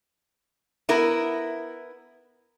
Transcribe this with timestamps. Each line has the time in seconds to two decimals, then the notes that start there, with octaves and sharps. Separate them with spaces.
0.89 B3 E4 A#4